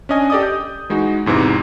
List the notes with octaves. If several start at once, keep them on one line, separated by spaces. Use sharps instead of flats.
C#4 D4 D#5 G#5
G4 A4 D5 D#5 D#6
G6
E3 G#3 D#4 F#4
E2 G#2 C3 E3